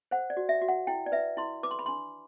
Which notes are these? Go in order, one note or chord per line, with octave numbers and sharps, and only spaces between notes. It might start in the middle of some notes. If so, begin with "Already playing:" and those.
C5 F#5
D5
F#4
E5
F#4
F#5
E4 G5
D5
B4 E5
E4 C6
B4 D6
C6
B5
D4 C6